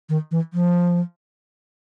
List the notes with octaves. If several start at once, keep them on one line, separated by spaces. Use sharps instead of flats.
D#3
E3
F3